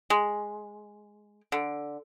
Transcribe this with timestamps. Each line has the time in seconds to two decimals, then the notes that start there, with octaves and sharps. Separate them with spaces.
0.10 G#3
1.52 D3